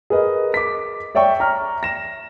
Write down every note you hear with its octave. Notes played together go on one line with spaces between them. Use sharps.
G#4 A#4 B4 D#5
D6 B6
C#5 D5 E5 G5 C#6
A#5 C#6 F6
A#6 E7